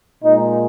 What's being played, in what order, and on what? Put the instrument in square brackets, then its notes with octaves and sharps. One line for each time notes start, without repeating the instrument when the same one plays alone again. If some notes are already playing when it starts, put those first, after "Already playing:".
[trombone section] A#2 G#3 D#4